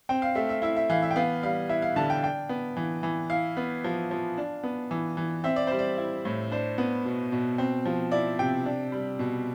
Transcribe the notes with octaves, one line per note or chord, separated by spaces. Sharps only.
C4 G5
F5
A3 E5
E5
E4 E5
E5
E3 F5
E5
G5
B3 F5
G3 F5
E4 E5
F5
D3 A5
G5
D4 G5
B3
E3
E3
E4 F5
B3
F3
F3
D4
B3
E3
E3
C4 E5
D5
G3 C5
D5
E4
A2
D4 C5
B3
B2
B2
C4
F3
E4 D5
C3 G5
D4
G3
B2